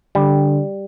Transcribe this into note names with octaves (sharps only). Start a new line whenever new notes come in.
D3 G3